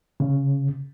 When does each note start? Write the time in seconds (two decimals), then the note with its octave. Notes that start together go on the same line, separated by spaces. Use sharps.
0.20 C#3